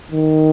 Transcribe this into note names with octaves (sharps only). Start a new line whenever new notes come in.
D#3